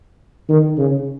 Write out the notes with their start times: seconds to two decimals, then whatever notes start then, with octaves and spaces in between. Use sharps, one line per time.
0.49 D#3
0.78 C#3